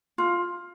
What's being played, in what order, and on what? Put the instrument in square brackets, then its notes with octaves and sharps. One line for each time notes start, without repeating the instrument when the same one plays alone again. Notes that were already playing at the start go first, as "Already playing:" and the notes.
[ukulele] F4